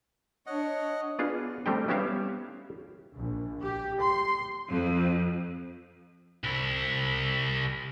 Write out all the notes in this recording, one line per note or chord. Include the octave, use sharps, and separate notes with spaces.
D4 C#5 D#5 F#5
B3 D4 F4 G#4
G3 A3 C4 G4 G5
G3 B3 C#4 G4 E5 F5
A#1
G4
C6
F2
C2 E4